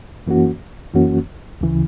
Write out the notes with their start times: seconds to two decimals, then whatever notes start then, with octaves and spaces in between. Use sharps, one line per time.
0.26 F#2 E3 A#3 C#4 F#4
0.94 F#2 E3 A#3 C#4 F#4
1.61 D2 C#3 E3